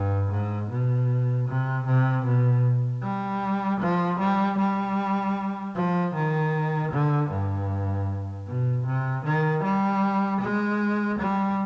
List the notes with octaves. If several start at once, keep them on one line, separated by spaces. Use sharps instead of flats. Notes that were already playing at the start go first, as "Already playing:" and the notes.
Already playing: G2
G#2
B2
C3
C3
B2
G3
F3
G3
G3
F3
D#3
D3
G2
B2
C3
D#3
G3
G#3
G3